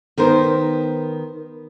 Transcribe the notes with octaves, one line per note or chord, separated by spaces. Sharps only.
D#3 B3 A#4 C5